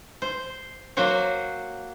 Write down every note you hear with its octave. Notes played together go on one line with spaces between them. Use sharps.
C5
F#3 A#3 F#4 C5 C#5